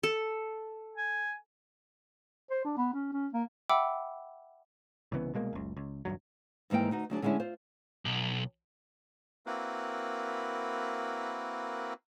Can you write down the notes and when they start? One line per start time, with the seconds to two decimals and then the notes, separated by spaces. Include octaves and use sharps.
0.03 A4
0.96 G#5
2.50 C5
2.65 D4
2.77 B3
2.94 C#4
3.13 C#4
3.33 A#3
3.69 E5 F#5 G5 B5 D6 E6
5.12 C2 C#3 E3 B3
5.34 C2 B2 G#3 A#3
5.53 F#1 C#2
5.77 C#2
6.05 D#1 C#2 G2 F#3
6.70 D#2 G#2 E3 A#3 G5
6.91 D2 D#4 F#4
7.10 D2 F#3 D4 G#4
7.22 D3 G#3 C#4 D4 E4
7.40 F4 C5
8.05 B1
9.46 A#3 C4 E4 F#4 A#4 B4